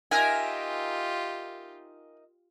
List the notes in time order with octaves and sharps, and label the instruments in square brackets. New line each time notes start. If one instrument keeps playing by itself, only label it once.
[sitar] D#4 A#4 E5 [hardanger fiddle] F4 G4 [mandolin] G#5